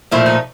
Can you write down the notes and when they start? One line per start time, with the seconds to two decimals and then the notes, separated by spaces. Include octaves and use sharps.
0.11 A#2 F3 A3 E4
0.26 D#4